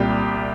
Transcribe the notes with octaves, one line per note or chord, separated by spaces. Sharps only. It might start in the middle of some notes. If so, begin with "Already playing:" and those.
Already playing: C2 A#2 G3 G4